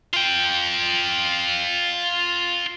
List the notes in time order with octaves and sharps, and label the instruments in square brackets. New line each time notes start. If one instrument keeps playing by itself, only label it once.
[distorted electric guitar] F4 G5